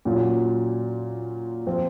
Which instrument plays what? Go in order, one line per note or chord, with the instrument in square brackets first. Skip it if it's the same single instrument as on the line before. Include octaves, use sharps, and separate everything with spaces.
[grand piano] A#2 F#3 C#4 F4
F3 C4 F4